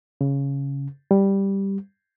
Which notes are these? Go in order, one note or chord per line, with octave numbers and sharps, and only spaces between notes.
C#3
G3